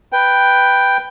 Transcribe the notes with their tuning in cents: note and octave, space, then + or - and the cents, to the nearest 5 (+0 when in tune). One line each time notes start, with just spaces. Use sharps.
B4 +0 G5 +0